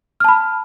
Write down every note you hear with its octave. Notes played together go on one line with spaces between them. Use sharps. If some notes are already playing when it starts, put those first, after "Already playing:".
A5 B5 F6